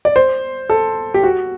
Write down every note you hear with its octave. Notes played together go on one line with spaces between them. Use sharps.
D5
C5
A4
G4
F#4